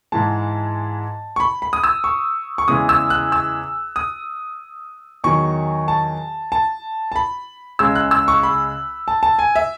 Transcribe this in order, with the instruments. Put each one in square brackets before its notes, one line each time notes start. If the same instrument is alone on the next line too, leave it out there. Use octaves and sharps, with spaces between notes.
[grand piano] G#2 E3 G#3 A5
C#6
B5
B5
D#6
E6
C#6
C#6
E2 C#3 E3 G#3 D#6
E6
F#6
E6
D#6
E2 D#3 F#3 C#6
A5
A5
A5
B5
C#2 C#3 G#3 E6
F#6
E6
C#6
B5
A5
A5
G#5
E5